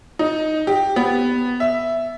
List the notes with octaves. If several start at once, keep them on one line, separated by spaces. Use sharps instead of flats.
D#4
G4
B3
E5